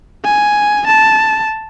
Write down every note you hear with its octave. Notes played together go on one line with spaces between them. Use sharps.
G#5
A5